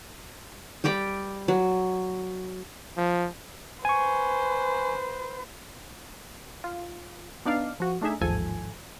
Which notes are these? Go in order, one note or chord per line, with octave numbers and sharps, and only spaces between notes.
G3 G4 D5 G5
F#3
F3
B4 C5 G#5 C#6
F4
B3 D4 D#4 D5 F5
F3 F#4
A3 D4 D#4 G#4 E5
A1 D#2 G#2 F3 A4 G#5